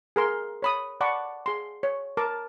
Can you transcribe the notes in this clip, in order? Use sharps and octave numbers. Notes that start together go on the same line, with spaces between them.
G#4 A#4 C6
C#5 B5 D#6
D5 F#5 A5 B5 C#6 D6
G#4 C6
C#5
A#4 A5 D6